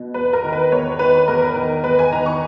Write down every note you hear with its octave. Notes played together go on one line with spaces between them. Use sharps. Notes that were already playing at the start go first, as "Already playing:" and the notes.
Already playing: B2
E2 B4
A#4
D#3
B4
E2 C#5
D#3 B4
E2 A#4
D#3
E2 B4
G#5
D#3 A#5
C#6